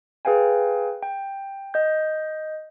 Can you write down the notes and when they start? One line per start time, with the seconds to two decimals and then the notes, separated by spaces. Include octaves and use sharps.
0.25 G#4 B4 F5 G5 G#5
1.03 G5
1.74 D#5 G6